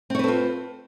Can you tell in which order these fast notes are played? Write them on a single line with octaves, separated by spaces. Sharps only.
C4 C#5 B4 A4 F4